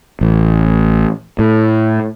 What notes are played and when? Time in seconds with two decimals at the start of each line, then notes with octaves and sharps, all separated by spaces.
0.21 A1
1.39 A2